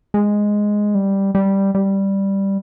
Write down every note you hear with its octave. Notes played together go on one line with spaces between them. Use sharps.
G#3
G3
G3
G3